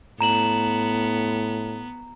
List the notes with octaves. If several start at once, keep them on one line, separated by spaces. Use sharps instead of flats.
A2 B3 A#5 E7 F#7